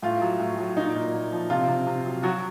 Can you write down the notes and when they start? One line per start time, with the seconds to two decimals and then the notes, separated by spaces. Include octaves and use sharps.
0.02 A2 F4
0.22 F#3
0.40 A2
0.58 F#3
0.76 A#2 D#4
0.95 A#2
1.14 A#2
1.32 F3
1.50 C3 F4
1.68 C3
1.87 C3
2.06 F#3
2.23 F#3 F#4